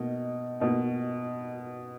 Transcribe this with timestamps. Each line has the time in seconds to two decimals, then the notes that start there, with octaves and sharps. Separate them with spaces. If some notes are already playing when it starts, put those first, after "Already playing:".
Already playing: B2 A#3 D#4
0.60 B2 A#3 D#4